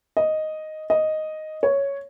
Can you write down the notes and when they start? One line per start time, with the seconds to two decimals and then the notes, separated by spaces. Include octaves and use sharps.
0.17 D#5
0.90 D#5
1.63 C#5